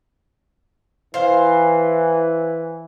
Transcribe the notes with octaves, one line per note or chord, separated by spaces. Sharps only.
E3 C5 F5